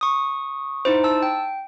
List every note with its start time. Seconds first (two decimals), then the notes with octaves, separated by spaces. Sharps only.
0.01 C#6 D#6
0.85 D#4 E4 C5
1.04 A5 E6
1.23 G5